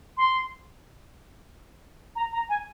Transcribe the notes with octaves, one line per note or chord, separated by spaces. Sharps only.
C6
A#5
A#5
G#5